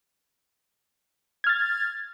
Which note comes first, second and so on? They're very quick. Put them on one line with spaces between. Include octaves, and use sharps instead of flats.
G#6 F6 A6